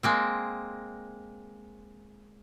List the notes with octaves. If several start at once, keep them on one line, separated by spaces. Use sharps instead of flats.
G#3 A#3 C4